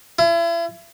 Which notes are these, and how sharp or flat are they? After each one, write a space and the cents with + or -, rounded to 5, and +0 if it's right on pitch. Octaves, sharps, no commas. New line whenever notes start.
E4 +40